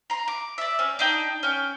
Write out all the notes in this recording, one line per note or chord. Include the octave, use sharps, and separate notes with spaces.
A#5 C6
D6
D5 E5
C4 C#4
D4 D#4 G5
C#4 G5